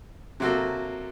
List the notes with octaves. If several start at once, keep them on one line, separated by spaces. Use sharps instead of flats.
C3 F#3 A#3 F#4 A4